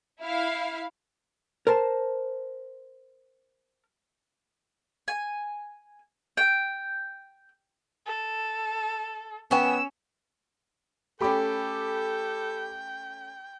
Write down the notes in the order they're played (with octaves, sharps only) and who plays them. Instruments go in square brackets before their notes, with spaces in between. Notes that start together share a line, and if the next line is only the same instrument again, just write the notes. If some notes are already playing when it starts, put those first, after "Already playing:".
[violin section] E4 F5
[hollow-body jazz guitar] A#4 C5 A5
[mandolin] G#5
G5
[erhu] A4
[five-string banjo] E3 G5 G#5 [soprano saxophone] B3 [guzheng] C#4 C#5 [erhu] E6
[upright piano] A3 C#4 [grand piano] G4 B5 D6 [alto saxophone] A4 [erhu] G5